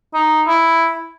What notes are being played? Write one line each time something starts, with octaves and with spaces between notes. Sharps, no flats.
D#4
E4